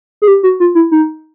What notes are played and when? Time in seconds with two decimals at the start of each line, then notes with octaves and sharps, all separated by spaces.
0.22 G#4
0.28 G4
0.43 F#4
0.60 F4
0.75 E4
0.92 D#4